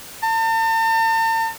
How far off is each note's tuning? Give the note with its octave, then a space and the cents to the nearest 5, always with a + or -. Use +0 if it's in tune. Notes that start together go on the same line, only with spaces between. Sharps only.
A5 +45